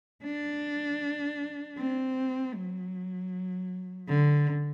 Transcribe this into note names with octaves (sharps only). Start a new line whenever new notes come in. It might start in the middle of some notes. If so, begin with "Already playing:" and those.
D4
C4
F#3
D3